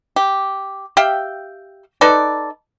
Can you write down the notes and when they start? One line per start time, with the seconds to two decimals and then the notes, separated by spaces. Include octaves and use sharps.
0.16 G4
0.97 G4 E5 F5 G5
2.01 D#4 A4 B4 D5